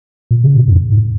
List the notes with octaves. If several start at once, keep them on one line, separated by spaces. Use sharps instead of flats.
A#2
C#3
A#2
G#2
F2
G#2